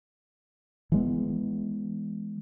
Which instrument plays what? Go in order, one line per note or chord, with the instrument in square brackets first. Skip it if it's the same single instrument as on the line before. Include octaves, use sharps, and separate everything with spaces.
[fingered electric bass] E3 G#3 B3